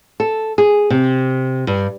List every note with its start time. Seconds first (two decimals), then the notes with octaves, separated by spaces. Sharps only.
0.20 A4
0.58 G#4
0.90 C3
1.67 G2